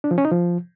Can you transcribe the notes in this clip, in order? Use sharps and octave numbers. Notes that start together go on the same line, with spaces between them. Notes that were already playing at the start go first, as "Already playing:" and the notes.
D4
F3
C#4
D#4
F3